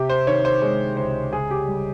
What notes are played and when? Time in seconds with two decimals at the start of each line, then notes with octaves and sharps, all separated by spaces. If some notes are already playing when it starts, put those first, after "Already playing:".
Already playing: C3 G4
0.10 C5
0.27 D#3 C#5
0.45 C5
0.62 G#3 C#5
0.97 C#2 C5
1.33 C#3 G#4
1.51 G4
1.68 G3